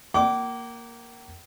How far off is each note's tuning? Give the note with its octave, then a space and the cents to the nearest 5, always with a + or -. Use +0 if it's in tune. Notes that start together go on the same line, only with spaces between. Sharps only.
A#3 +0 G5 -45 D6 -15